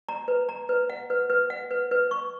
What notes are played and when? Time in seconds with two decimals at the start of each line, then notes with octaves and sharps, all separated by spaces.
0.09 A#5
0.28 B4
0.49 A#5
0.69 B4
0.90 F#5
1.10 B4
1.30 B4
1.50 F#5
1.71 B4
1.91 B4
2.11 C#6